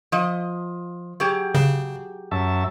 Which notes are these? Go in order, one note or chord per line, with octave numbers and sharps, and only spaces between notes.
F3 D#5
F#3 G4 G#4
C#3
F#2 E5 A5